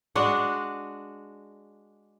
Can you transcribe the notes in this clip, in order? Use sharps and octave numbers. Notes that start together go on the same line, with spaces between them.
G#3 D4 F#4 F#5